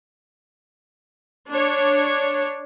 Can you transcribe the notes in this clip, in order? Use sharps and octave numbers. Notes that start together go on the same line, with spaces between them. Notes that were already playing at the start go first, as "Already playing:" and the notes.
D4 C#5